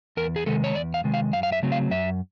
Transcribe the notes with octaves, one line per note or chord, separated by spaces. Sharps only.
E2 A#4
G#4
C3 D#3 G#3 A4
C#5
E2 D5
F5
C3 D#3 G#3
F5
F#2 F5
F5
E5
C#3 F#3 A3 C4
F5
F#2 E5